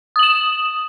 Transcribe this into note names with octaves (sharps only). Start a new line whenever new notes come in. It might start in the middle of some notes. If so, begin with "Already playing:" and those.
D#6 E7 F#7